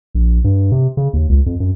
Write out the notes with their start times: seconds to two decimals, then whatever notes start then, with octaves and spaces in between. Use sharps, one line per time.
0.15 A#1
0.44 G2
0.72 C3
0.97 C#3
1.13 D#2
1.29 C#2
1.46 F2
1.60 F#2